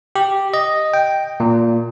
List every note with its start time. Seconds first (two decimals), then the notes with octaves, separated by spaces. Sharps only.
0.16 G4
0.54 D#5
0.94 G5
1.40 A#2